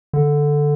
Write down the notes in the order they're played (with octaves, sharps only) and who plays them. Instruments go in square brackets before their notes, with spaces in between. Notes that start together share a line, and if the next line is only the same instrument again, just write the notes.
[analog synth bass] D3